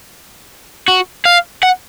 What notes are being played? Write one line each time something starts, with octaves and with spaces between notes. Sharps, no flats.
F#4
F5
F#5